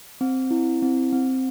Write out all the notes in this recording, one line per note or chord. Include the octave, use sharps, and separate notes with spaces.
C4
E4
C4
C4